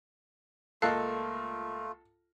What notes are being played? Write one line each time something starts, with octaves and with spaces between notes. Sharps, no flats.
C#2 A3 A#3 F4 A4 D#5 F5 F#6